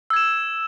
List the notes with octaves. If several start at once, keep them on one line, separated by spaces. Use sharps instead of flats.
E6 G#6 E7